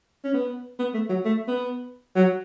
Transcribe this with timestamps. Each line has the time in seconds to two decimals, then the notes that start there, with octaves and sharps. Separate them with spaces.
0.24 C#4
0.33 B3
0.79 B3
0.94 A3
1.09 F#3
1.25 A3
1.47 B3
2.15 F#3